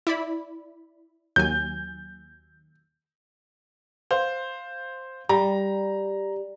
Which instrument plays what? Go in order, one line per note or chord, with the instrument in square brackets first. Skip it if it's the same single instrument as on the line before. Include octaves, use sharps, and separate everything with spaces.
[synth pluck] E4 D5 B5
[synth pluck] D#2 F#3 G#5 [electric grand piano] G6
[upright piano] C5 F5
[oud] G3 [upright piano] A#5